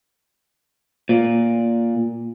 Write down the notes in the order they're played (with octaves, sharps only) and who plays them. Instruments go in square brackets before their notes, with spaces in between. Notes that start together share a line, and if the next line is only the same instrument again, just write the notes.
[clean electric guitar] A#2